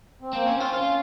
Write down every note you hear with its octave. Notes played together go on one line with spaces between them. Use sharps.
C4
A#3 C4
C#4
C4
F4
C#4 F4